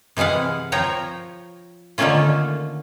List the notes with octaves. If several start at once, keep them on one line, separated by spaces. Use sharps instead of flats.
C3 E3 G#3 F5 F#5
F3 C#5 G5 A#5
D3 D#3 A3 A#3 C#4 F4